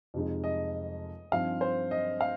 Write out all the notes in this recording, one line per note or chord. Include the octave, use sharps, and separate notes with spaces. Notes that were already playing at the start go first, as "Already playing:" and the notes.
F2 C3 F3 G#3 D#4
D#5
G2 F3 C4 D#4 F5
C5
D#5
F5